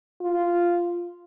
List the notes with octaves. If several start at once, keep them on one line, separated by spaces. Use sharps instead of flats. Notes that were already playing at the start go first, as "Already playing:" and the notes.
F4